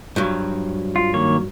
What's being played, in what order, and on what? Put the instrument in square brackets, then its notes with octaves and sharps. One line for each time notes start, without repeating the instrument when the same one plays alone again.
[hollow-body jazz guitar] G2 F3 F#3
[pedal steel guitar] F4
D#3 A#3 C#5